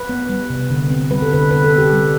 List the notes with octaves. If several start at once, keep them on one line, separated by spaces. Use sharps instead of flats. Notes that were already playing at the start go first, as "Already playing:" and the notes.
Already playing: B4
B3
G3
C3
D3
C4
G3 B4
A4
D3 B4
D3 B4
A4
C4
G4
G3